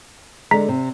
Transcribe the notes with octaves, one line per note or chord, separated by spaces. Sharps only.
D3 G#3 A#5 B6
C3